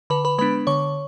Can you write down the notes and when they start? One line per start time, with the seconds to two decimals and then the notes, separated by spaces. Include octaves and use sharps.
0.10 D3 B4 B5
0.25 B4 B5
0.38 G#3 B3 D4 B4 B5
0.67 D3 C#5 C#6